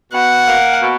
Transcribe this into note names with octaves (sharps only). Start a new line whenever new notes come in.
B2 F#5
A#3
B2